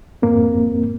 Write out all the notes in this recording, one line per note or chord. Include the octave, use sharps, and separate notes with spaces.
F2 G#2 A#3 C4